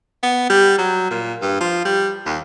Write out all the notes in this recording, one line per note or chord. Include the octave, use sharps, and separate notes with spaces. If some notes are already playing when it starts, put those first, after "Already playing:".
B3
G3
F#3
A#2
G2
F3
G3
D#2